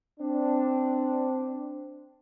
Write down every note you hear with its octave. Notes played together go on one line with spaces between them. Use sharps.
C4 D4